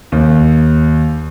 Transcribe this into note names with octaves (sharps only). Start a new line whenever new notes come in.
D#2